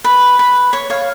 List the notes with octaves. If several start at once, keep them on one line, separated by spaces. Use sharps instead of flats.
B4
B4
C#5
C#5 F5